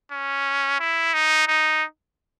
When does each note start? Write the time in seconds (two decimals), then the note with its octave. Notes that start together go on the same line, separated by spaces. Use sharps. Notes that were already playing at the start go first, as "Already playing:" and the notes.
0.12 C#4
0.80 E4
1.14 D#4
1.48 D#4